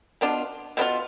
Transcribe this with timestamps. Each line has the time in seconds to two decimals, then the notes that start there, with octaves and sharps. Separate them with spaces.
0.21 B2 B3 D4 F4
0.77 B2 B3 D4 F4